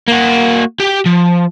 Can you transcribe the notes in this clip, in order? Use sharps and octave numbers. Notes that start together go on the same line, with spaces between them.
A#3 F#4
G4 G5
F3